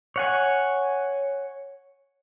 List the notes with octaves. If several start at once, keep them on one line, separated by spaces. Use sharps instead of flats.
C#5 F#5 G#5